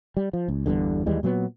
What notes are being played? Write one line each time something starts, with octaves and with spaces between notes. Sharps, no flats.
G3
F3
C#2
G1 E2 G2 D3
D#2 E3 G3 G#3
A#2 F#3 A3 B3